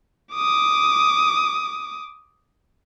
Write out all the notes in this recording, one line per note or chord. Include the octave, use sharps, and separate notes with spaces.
D6 D#6